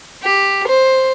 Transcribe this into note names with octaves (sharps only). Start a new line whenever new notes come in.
G4
C5